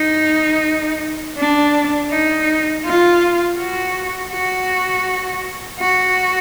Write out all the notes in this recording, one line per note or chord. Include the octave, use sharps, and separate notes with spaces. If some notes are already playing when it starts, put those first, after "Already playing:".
Already playing: D#4
D4
D#4
F4
F#4
F#4
F#4